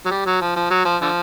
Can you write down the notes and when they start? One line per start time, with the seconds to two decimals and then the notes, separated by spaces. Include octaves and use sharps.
0.06 F#3
0.11 G3
0.26 F#3
0.41 F3
0.56 F3
0.70 F#3
0.85 F3
1.01 D3 F3